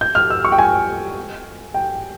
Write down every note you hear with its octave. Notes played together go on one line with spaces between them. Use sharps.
G6
F6
E6
C#6
G5
G#5
G5